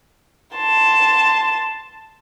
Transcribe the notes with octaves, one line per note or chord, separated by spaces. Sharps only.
A5 C6